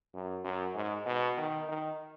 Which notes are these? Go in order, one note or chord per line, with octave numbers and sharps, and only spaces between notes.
F#2
F#2
G#2
B2
D#3
D#3